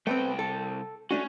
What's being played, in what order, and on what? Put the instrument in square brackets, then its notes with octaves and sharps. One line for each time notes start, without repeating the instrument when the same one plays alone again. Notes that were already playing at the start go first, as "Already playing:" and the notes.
[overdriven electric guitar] C2 G5 [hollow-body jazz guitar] A3 B3 C4
[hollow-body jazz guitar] A4
[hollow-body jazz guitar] A3 D4 F#4 [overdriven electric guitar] C#4